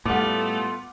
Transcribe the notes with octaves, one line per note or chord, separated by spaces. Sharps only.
A2 G3 A3 B3 F4 F#5 D6